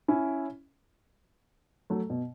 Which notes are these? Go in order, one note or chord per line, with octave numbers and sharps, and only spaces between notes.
C#4 E4
F#3 A3
B2